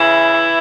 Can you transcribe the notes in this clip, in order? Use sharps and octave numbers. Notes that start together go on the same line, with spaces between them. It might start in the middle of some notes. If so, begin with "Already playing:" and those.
Already playing: C#3 E3 E4
E3